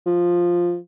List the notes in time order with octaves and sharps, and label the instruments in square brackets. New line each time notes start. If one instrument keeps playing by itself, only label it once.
[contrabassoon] F3